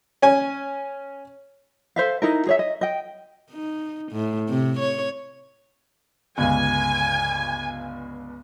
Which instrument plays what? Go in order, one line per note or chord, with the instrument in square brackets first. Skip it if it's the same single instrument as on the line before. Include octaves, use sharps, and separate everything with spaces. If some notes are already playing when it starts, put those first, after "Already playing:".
[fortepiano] C#4 G#5
[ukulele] A4 C5 E5 F5
D#4 E4 A#4
G#4 C#5 E5
D#5
D#5 G5
[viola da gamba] D#4
A2
C3
C#5
[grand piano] G1 C#2 [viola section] G#5